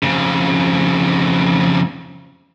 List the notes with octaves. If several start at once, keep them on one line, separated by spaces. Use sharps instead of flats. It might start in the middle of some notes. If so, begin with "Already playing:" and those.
F2 C#3